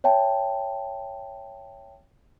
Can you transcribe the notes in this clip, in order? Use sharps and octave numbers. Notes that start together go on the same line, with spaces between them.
C#5 E5 G5 A5